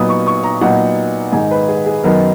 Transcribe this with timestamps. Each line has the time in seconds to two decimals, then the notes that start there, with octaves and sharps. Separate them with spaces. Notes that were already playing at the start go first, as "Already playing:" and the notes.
Already playing: A#2 F#3 B3 D#4 D#6
0.09 C#6
0.27 C#6
0.43 A#5
0.61 A#2 F#3 B3 D#4 F#5
1.32 G#2 D#3 G#3 D#4 G#5
1.51 B4
1.68 G#4
1.86 G#4
2.04 F#2 D#3 F#3 B3 D#4 A#4